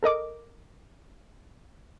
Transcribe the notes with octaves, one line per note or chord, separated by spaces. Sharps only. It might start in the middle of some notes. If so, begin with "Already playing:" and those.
A4 A#4 D#5 D6